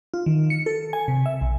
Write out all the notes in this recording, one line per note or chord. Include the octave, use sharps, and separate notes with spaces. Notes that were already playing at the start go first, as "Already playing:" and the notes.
F4
D#3
C#7
A4
G#5
C3
E5
B1